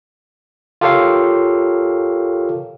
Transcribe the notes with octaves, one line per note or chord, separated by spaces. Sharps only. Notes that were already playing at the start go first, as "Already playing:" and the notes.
F4 G4 A4 A#4 C#5 F5